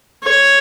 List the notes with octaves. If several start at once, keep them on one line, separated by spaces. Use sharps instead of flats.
C#5